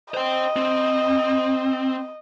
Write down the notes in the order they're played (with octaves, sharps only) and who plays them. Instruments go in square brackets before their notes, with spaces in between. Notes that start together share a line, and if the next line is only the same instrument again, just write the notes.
[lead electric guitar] C5 G5 [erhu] D#5
[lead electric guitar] C4